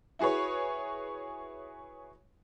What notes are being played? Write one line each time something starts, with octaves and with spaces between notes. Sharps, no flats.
E4 F#4 G#4 B4 C#5